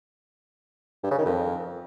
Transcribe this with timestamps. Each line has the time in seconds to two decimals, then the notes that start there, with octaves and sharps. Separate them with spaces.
1.04 G2
1.11 C#3
1.18 D#3
1.26 F2